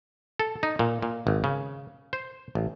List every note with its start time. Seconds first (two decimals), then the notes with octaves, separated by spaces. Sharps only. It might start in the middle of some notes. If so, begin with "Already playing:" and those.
0.40 A4
0.63 D#4
0.79 A#2
1.02 A#2
1.27 G#1
1.44 C#3
2.13 C5
2.55 A1